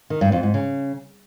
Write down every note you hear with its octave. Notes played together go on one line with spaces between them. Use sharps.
D#3
G2
F2
G#2
C#3